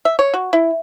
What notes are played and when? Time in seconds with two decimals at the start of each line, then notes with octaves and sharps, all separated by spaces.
0.05 E5
0.19 C#5
0.34 F#4
0.53 E4